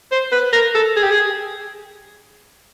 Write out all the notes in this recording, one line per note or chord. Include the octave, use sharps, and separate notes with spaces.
C5
B4
A#4
A4
G#4
G4
G#4